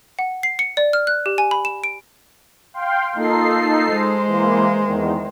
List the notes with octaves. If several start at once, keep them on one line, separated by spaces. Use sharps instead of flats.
F#5
C7
C#7
D5
F6
F#6
G4
G#5
B5
E7
D7
F5 G5 C6
A#3 D#4 F4 A4 C7
G#3 C5
E3 A#3
E2 D#3